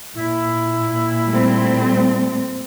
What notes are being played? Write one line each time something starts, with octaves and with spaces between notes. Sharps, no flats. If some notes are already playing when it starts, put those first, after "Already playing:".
A#2 E4
G3 A3 C4